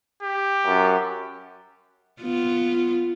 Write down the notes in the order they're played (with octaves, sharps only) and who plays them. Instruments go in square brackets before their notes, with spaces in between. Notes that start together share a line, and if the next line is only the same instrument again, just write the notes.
[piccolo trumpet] G4
[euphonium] F#2
[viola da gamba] B3 F4